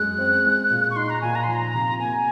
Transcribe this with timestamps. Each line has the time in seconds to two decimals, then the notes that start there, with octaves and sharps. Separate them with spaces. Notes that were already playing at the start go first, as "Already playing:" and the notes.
Already playing: F#2 G#3 F#6
0.18 C4
0.45 G#3
0.71 A#2
0.91 C#6
0.96 D#4 C6
1.10 A#5
1.21 A#2 G#5
1.35 A#5
1.44 F3 C6
1.53 A#5
1.74 C3
2.00 A#3 G#5